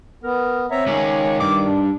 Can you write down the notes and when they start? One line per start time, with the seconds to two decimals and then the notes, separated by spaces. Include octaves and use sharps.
0.23 B3 A#4
0.71 C4 C#5 E5 A#5
0.86 C#2 D#3 G#3
1.40 G2 D6
1.66 D4